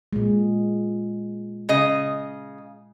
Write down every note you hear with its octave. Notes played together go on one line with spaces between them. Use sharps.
A#2 G#3
C#3 D#5